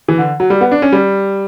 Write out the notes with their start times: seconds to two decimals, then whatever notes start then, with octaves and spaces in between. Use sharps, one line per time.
0.08 E3
0.18 D3
0.40 F#3
0.50 G3
0.61 B3
0.71 D4
0.82 C#4
0.92 G3